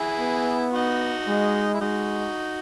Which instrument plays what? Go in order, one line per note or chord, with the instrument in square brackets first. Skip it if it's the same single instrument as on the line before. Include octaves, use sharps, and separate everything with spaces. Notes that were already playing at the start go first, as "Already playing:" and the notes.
Already playing: [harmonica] E4 G#4
[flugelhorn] B3
[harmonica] D#4 F#4
[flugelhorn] G#3
[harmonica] E4
[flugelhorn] G#3 [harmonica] D#4 F#4